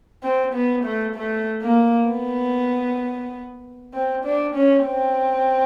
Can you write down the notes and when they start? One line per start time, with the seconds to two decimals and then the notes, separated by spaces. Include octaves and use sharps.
0.23 C4
0.54 B3
0.84 A3
1.15 A3
1.62 A#3
2.08 B3
3.93 C4
4.25 D4
4.55 C#4
4.86 C4